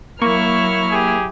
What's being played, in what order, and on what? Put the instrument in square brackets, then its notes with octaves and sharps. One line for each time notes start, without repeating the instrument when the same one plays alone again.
[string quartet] F#3 E4 F6 [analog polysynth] A#3 [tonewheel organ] C#6
[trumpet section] G4 G#4